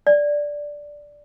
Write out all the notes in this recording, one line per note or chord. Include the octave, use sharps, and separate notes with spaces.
D5